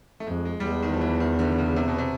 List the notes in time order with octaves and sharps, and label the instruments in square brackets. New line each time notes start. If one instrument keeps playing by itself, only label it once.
[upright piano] A3
[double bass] F2 [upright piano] G#3
[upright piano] G#3
G3
[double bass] E2 [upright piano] G#3
[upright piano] D#3
F3
E3
D#3
D3
C#3
C3
B2
C3